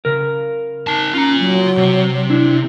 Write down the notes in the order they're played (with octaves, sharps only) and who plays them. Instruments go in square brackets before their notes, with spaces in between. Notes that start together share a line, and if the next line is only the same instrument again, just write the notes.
[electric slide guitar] C#3 A#4
[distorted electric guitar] D#4 A5
[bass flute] C#4 [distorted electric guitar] F4 A#5
[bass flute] F#3
[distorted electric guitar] C3
[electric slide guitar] D4 E4